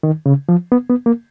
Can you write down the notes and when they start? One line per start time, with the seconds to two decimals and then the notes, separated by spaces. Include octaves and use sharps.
0.03 D#3
0.26 C#3
0.49 F3
0.72 B3
0.90 B3
1.06 A#3